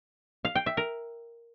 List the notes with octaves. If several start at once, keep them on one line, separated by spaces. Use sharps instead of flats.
F5
G5
E5
A#4